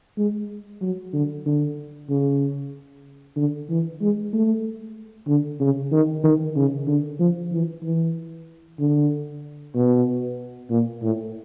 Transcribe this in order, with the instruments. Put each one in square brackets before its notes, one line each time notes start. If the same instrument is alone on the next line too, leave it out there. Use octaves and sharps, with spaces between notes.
[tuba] G#3
F#3
D3
D3
C#3
D3
E3
G#3
A3
D3
C#3
D#3
D#3
C#3
D3
F3
E3
E3
D3
B2
A#2
A2